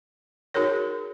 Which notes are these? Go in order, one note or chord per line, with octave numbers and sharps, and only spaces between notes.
D#4 F#4 G#4 A#4 C#5